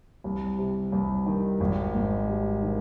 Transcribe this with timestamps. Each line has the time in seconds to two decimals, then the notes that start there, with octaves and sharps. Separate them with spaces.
0.24 C2
0.58 C3
0.92 C2
1.26 D#3
1.60 G#1
1.95 G#2
2.28 G3
2.63 D#3